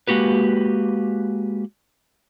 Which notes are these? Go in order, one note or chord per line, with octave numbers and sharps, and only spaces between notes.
G#3 A#3 F#4 G4 B4